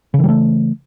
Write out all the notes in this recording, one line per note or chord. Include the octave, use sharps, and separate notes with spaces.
C#3 E3 G3 A3